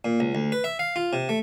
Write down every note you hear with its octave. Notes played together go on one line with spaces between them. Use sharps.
A#2
C#2
D2
B4
E5
F5
F4
C3
A3